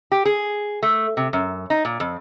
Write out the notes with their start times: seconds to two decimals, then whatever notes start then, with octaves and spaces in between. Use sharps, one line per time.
0.12 G4
0.25 G#4
0.83 A3
1.17 C3
1.33 F#2
1.70 D#4
1.85 A#2
2.00 F2